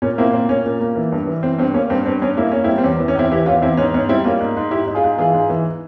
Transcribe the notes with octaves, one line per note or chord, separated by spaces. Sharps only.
A#2 C#4
A#3 C4 E4
A#2 C4
A#3 C#4
A#2
A#3
E3
G2
E3
E3 C4
G2 C4
A#3 C#4
G2 C4
G2 C4
G2 C#4
A#3 E4
A#3 C#4
C4 E4
G3
C4
E2 C#4
E3
C#4
E2 C4 E4
E3 E4 G4
E2 C#4 F4
E2 C4 E4
G#2 C#4
G#2 C#4
G3 C4 E4
A#3 C#4 F4
G#2
G#2
G#2 E4 G4
G#2
F4 G#4
G#2
E3 F4 G#4
G#2
E3